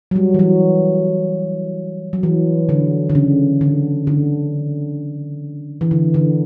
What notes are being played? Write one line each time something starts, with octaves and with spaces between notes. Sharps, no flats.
F#3
G3
E3
F#3
F#3
E3
D3
D3
C#3
D3
D3
E3
D3
D3